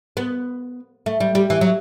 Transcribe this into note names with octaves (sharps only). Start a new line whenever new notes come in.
B3
A3
G3
G3
E3
F#3